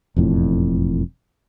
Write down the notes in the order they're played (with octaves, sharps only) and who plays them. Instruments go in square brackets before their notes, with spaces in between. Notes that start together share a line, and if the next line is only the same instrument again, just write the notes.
[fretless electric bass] E1 F2 A2